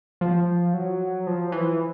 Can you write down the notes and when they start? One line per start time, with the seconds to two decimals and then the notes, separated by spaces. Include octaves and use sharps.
0.21 F3
0.74 F#3
1.27 F3
1.52 E3